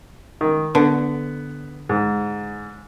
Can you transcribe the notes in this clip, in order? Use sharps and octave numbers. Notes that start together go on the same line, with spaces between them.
D#3
D3 B3
G#2